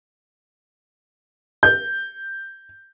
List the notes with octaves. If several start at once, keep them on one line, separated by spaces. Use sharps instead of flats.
G6